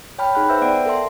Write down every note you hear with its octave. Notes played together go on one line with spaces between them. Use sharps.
C#5 G5 A5 B5 F6
D#4 G#4 F#5 B5 F#6
B4 C5 E5 E6 G6
B3 D5 F#5 G5 D7
A4 A#4 E5 A5 C6